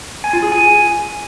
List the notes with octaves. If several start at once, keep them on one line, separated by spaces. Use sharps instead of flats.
G#5
F4
G#4
G#5